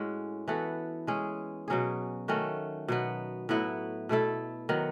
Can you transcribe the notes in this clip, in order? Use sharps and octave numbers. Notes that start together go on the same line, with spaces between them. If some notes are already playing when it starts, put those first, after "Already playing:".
Already playing: A2 G#3 C#4 F#4
E3 B3 F#4 A4
G#3 C#4 G#4
B2 F#3 C#4 G#4
D#3 A3 C#4 F#4
B2 F#3 B3
A2 F#3 B3 E4
B2 A3 E4 A4
D#3 F#3 B3